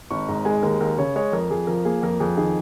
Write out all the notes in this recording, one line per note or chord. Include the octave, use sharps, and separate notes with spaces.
G#1 C#6
G#2 A#5
G#3 G#5
D#2 A#4
D#2 A#4
C#3 C#5
G#3 C#5
F2 A#4
F2 G#4
F3 A#4
A#3 G#4
F2 A#4
F2 G#4
D#3 G#4